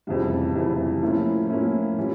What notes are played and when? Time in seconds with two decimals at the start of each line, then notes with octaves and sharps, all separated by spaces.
0.07 F1 F2 C#3 E3 G3
0.55 F1 F2 C#3 E3 G3
1.02 A2 F3 A#3 C#4 E4
1.50 A2 F3 A#3 C#4 E4
1.98 E3 G3 C#4 F4